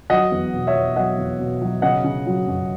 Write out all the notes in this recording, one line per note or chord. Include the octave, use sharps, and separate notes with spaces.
F#3 D#5 F#5
E2
B2
C#5 E5
E2
F#3 D#5 F#5
E2
B2
F#3
C#3 D#5 F#5
C#3
F#3
F#2